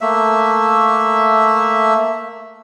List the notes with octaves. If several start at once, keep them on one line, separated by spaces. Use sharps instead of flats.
A3 A#3 E5